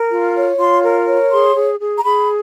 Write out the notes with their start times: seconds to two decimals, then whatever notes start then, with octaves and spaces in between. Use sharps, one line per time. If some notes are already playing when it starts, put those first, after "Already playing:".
Already playing: A#4
0.09 F4
0.34 C#5
0.58 F4 C6
0.83 A#4
1.07 C#5
1.31 G#4 C6
1.56 G#4
1.81 G#4
1.99 A#5
2.04 G#4 B5